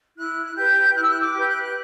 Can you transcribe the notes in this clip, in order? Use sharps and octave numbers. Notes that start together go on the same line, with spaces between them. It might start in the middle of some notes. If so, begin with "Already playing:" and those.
E4 F#6
F#6
G4 B4 G6
E4 F#6
E6
F#6
D6
G4 B4 G6
F#6
F#6